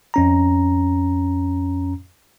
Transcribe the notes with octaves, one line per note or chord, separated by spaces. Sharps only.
F2 C#4 A#5